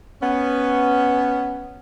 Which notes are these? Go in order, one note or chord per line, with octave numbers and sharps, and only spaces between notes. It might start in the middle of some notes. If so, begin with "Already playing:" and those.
B3 C#4